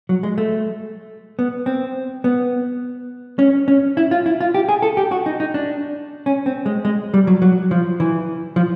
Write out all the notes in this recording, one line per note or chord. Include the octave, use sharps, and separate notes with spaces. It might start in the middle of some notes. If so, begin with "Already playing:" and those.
F#3
G#3
A3
B3
C4
B3
C#4
C#4
E4
F4
E4
F4
G4
G#4
A4
G4
F#4
D#4
D#4
D4
C#4
C4
G#3
G#3
G3
F#3
F#3
F3
E3
F3